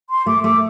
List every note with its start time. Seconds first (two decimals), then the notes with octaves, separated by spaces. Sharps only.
0.10 C6
0.26 A3 D6
0.44 A3 D6